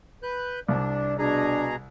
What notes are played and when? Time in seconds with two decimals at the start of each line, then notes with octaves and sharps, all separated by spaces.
0.23 B4 F#6 G6
0.68 C2 D4 D5
1.19 B2 D4 G#4 A#5